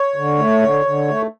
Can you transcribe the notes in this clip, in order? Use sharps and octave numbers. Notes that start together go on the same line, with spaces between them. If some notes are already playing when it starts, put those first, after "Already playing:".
Already playing: C#5
D3
A3
D3
D3
A3